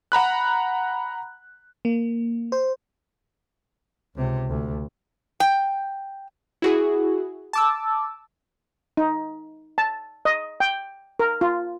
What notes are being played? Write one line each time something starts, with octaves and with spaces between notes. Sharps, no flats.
F#5 A#5 B5 F#6
A#3
C5
C#2 C3
D2
G5
E4 F#4 G#4
A5 D6 E6
D#4
A5
D#5
G5
A#4
F4